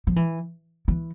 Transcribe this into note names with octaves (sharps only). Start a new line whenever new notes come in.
F3
E3
E3